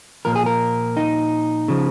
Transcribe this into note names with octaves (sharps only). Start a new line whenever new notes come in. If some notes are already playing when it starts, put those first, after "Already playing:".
A#2 F3 A#4
G#4
A#4
D#4
C#3 F3